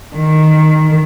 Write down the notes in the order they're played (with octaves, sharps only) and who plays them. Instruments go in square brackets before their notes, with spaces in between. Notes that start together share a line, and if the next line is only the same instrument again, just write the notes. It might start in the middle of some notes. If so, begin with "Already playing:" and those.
[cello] D#3